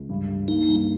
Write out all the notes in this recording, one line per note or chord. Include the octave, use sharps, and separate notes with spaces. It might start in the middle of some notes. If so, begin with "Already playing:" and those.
Already playing: C#2
G2
G2
A#3 D#4
G2